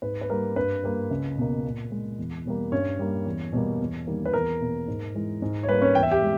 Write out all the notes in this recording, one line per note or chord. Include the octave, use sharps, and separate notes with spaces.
G#2 B4
B4
G3 A#3 A#4
G2 B4
G3 A#3
C#2
B2 A#3
A#2
G#3
E2
B2 G3 A#3
G2 C#4 C#5
G3 A#3
E2
B2 G3 A#3
E2
D#3 G3 A#3
B4
E2 A#4
B2 A#3
G#2
E3 G#3
G#2
C#5
G3 A#3 B4
C#4 C#5
E2 G5
E5
G4 G5
G#3